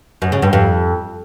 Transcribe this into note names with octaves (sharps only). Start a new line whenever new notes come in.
F#2
C#3
G2
F2